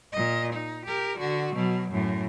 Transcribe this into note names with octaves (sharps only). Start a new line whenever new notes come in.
A#2 D#5
D#4
G4 A#4
D3 F#4
B2 F#3
F#2 A2